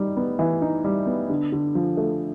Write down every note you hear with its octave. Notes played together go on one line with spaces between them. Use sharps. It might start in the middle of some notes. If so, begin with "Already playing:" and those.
Already playing: G3 D#4
B3
E3
D#4
G3
B3
D3
D3
F3
A3